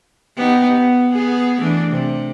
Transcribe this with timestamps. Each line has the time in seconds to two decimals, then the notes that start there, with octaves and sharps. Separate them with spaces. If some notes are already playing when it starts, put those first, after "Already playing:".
0.37 B3 D#4 G4
0.78 B3
1.12 B3 G#4
1.59 E3 A3 D4
1.91 C3